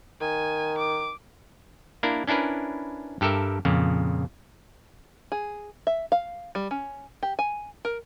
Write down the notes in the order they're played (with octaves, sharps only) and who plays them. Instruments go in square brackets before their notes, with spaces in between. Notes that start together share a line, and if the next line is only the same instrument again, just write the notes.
[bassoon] D#3 [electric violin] G#5
[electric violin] D6
[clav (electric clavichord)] A#3 D4 E4 A#4
C#4 D4 E4 A#4 B4
G2 G4 A4 A#4 E5
F2 A#2 C#3
[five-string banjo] G#4
E5
F5
G3
C#4
G4
G#5
A#4